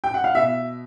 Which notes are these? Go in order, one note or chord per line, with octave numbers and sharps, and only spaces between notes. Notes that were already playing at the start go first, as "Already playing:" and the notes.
G5
F#5
F5
B2 E5